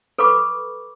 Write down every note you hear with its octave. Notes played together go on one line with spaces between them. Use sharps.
A4 B4 B5 C#6 D6